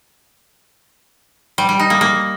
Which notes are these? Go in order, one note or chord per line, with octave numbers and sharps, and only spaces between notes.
G3
G3
D#4
A#3
A#3